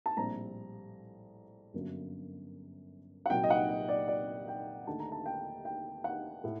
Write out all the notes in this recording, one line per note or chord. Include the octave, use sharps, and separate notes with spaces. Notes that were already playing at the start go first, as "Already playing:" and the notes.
A5
A#1 A2 G3 C4 A#5
G1 F#2 D3 F#3 A#3
F#5
C2 A#2 F#3 G5
D#5
F#5
D#5
D5
D5
G5
D#2 D3 A3 A5
A#5
A5
G5
G5
F#5
A2 A3